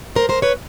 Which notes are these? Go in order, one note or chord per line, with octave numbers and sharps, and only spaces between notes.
A#4 C5
A#4 C5
B4 C#5